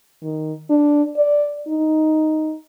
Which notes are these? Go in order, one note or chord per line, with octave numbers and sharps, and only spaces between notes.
D#3
D4
D5
D#4